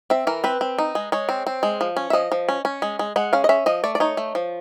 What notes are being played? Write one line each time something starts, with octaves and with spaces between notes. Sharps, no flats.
C4 E5
E3 A#4
C4 B4
C4
D#4
G#3
G#3 C#5
C4
C4
G#3
F3
C#4
E5
F3 D#5
F3
C#4
C#4
G#3
G#3
G#3 F#5
C#4 F5
D#5
C#4 E5
F3 D#5
A3 D5
D5
D#4 C#5
A3
F3